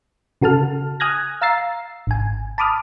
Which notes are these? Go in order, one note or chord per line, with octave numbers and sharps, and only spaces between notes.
C#3 F#4 A4 A5 F6
G#5 D#6 F6 F#6 G#6 A#6
F5 A#5 E6 A6 C7
G#1 G#5
A5 B5 D6 D#6 F6